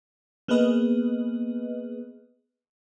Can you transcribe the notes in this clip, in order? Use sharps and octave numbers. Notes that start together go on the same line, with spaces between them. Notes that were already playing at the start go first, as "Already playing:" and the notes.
A#3 B3 G#4 B4 D#5